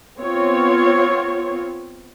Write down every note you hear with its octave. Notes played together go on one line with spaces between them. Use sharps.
B3 C4 F4 C#5